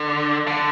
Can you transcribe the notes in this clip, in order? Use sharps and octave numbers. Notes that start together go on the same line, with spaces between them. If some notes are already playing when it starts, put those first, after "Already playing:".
Already playing: D3
D3